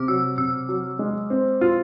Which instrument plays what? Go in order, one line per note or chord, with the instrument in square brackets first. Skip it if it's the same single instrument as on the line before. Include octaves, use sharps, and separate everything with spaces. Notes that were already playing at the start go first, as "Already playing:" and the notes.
Already playing: [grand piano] C3 [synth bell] D6 F6
[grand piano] F#3 [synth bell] E6
[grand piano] C3 [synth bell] E6
[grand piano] F#3
G#3
C4
F4